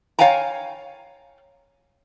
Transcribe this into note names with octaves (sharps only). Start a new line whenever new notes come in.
C#5 E5 F5 G5 G#5 A#5